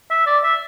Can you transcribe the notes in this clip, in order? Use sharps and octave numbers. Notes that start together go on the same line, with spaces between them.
E5
D5
E5